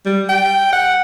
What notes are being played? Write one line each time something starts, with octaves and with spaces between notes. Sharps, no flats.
G3
G5
F#5